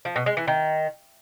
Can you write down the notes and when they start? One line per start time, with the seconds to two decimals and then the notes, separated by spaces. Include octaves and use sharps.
0.05 F3
0.16 B2
0.26 G#3
0.37 E3
0.48 D#3